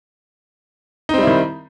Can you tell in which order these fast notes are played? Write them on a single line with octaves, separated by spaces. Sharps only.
D#4 C4 G3 E4 D#3